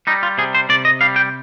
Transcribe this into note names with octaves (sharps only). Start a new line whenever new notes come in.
G3 D#4
F4
C3 G#4
C5
C3 D5
D#5
G3 F5
G5